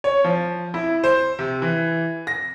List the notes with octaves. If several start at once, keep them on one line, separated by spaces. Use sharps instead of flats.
C#5
F3
E4
C5
C3
E3
A#6